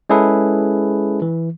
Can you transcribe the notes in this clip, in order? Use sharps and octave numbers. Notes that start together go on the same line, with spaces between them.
G#3 C#4 E4 G#4 A4 B4
E3